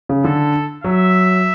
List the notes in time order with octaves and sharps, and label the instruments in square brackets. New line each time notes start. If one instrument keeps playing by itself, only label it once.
[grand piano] C#3
[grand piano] D3 [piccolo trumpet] A4
[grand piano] F#3 [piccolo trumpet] E5